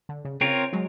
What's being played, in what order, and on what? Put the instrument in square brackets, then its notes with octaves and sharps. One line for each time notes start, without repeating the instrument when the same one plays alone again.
[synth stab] D3
C#3
[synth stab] C#3 [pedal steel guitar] C4 F4 A#4 C#5
[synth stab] F#3 G#3